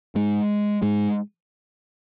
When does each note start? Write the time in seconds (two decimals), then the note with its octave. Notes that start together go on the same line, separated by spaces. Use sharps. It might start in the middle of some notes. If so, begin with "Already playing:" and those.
0.15 G#2 G#3
0.82 G#2 G#3